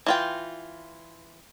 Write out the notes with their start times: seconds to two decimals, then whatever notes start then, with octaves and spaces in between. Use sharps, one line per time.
0.06 E3 F4 G5